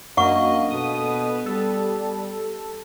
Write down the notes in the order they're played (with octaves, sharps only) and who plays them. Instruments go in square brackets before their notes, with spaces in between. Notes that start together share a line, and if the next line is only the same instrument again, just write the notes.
[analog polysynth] F#2 A#3 [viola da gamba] D4 D#5 [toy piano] F#5 C#6
[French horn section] B2 A4 [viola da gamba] B3 [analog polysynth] D#6
[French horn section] G3 [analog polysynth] A4